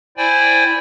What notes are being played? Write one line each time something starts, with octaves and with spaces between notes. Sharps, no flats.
E4 C5 D5 G5 G#5